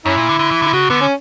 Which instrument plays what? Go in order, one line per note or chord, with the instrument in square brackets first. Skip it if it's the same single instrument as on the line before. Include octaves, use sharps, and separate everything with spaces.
[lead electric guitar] F#2 [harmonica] C#4 E4
[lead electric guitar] A#2
D3
D3
E3
D3
[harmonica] E4
[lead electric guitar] C#3 [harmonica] F#4
[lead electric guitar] D3 [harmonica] B3
[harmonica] C#4